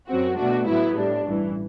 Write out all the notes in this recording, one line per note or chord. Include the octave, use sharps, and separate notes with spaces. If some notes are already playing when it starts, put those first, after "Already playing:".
F#2 F#3 C4 F#4
B2 A3 D4 F#4
A2 F#3 B3 E4
A2 G3 D4
A1 G2 E3